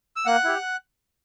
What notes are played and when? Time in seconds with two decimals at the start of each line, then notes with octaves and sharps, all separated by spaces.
0.16 E6
0.26 A#3 F#5 F#6
0.44 E4 G4